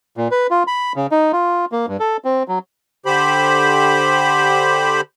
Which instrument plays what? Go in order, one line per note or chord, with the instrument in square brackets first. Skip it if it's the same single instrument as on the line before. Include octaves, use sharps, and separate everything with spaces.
[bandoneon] A#2
B4
F4
B5
C#3
D#4
F4
A#3
G2
A4
C4
F#3
[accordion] D3 G4 C5 B5